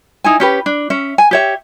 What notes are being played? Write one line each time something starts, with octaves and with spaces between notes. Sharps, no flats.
D#4 E4 G#5
C#4 G4 B4
D4
C#4 E5
G#5
G4 C#5 E5